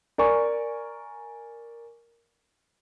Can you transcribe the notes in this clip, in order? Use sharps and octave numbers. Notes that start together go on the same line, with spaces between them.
A#4 D5 G#5 C#6